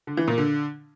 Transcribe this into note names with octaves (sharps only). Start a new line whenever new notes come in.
D3
E3
A#2
D3